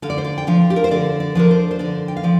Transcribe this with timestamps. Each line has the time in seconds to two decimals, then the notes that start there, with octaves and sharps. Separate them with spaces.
0.02 D3 F5
0.10 D5
0.18 C5
0.24 D5
0.38 G5
0.47 F3 D4 F5
0.70 G4
0.76 A#4
0.84 C5
0.91 D3 D5
1.20 D5
1.35 F3 D4 A#4
1.51 C5
1.71 C5
1.79 D3 D5
2.08 G5
2.17 F5
2.23 F3 D5